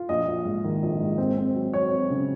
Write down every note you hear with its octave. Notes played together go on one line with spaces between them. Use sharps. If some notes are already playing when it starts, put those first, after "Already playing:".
Already playing: F4
A#1 D#5
A#1
G#2
D#3
A#1
G#2
C4
C4
F#3
F#3 C#5
C4
C#3